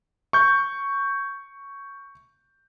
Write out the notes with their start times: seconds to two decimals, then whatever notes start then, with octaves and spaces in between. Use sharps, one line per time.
0.33 C#6 G6